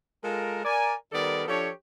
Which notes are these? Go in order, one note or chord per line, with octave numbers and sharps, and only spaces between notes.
G#3 F4 A4 A#4
A#4 D5 G#5
D#3 G3 B3 A4 A#4 D5
F3 D4 G4 A4 C#5